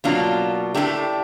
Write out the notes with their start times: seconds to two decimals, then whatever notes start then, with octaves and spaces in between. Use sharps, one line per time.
0.04 B2 F#3 A#3 D4 F4
0.74 A2 F3 A3 D4 G4